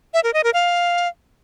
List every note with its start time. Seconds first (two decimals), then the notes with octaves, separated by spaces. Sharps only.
0.14 E5
0.24 A#4
0.34 D#5
0.44 A#4
0.54 F5